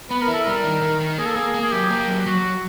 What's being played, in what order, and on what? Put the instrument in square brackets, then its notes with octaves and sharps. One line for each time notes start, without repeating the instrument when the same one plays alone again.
[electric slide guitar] B3 [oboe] B4
[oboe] A#4
[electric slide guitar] E4
[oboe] A4
[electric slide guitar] G3 [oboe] A#4
[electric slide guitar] D#3
D#3
D#3
[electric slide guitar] A#3 [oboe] G#4
[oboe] A4
[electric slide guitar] A#3 [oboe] G#4
[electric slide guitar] A#3
[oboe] G#4
[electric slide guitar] F#3 [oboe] G4
[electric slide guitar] A#3
F#3
[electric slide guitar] F#3 [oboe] F#4